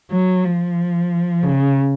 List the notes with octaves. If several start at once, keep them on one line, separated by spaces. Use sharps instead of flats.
F#3
F3
C#3